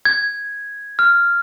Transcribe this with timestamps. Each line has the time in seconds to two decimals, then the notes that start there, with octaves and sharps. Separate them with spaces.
0.05 G#6
0.99 F6